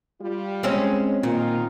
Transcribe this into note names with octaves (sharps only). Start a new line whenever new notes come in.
G3 F4
G#3 C4 C#4
A#2 D#3 D#4 F4